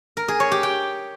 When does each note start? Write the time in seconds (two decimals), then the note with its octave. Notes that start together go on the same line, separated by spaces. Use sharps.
0.17 A#4
0.28 G#4
0.40 C#5
0.52 G4
0.63 G5